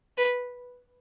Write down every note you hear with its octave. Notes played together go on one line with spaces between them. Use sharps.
B4